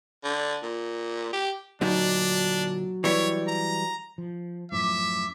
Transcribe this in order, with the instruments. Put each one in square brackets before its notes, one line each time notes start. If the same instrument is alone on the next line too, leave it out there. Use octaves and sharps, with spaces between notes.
[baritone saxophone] D3
A#2
G4
[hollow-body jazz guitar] D2 A#2 D#4 [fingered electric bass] F#3 [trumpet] D4
[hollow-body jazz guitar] E3 G3 E4 [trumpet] C#5
[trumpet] A#5
[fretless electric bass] F3
[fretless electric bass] F#2 A2 F3 [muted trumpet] E5 [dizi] D6